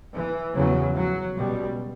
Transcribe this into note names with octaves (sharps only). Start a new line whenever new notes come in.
E3
E2 C#3 F#3
F#3
C#2 B2 G3